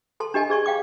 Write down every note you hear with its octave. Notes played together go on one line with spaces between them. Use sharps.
A4 A5 C6
D4 G4 D#5 G#5 A5
G#4 D5 C#6
F5 G5 D6